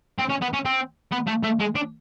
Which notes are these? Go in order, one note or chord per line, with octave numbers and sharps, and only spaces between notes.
C4
C#4
B3
C#4
C4
B3
A3
A3
G#3
D4